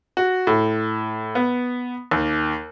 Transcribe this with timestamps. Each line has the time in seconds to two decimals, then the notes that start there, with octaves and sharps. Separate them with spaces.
0.17 F#4
0.47 A2
1.35 B3
2.11 D#2